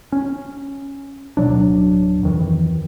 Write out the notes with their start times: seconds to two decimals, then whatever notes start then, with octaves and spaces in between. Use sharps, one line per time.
0.12 C#4
1.37 D1 B2 F#3 D4
2.23 F2 D#3 E3